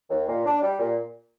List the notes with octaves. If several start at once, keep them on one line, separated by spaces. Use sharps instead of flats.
D#2
A#2
D4
G3
A#2